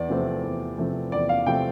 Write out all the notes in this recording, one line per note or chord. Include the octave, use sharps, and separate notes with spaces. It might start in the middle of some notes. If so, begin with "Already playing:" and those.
Already playing: E2 D5
C3 F3 A3 C4
E2
C3 F3 A3 C4
E2 D5
F5
C3 F3 A3 C4 G5